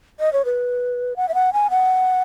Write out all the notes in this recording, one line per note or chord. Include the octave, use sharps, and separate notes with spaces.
D#5
C#5
B4
F#5
E5
F#5
G#5
F#5